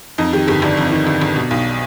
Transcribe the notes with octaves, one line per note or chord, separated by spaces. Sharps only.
F2 D#4
D#3 G4
G1 G4
G1 D4
F2
D#3
G1
G1
B2
B1